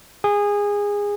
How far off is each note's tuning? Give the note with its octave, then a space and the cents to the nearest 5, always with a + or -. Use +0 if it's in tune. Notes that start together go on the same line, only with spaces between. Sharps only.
G#4 -20